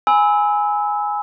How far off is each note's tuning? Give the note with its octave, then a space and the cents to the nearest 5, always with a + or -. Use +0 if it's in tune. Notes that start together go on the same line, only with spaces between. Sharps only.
G#5 +0 B5 +15 E6 -20